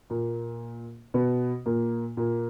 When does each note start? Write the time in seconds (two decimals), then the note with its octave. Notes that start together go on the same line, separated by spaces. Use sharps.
0.10 A#2 A#3
1.14 B2 B3
1.66 A#2 A#3
2.17 A#2 A#3